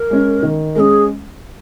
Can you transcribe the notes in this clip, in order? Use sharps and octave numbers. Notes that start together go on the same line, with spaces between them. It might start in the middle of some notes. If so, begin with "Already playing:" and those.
Already playing: A#4
G#3 C#4
D#3
G#3 C#4 G#4 A#4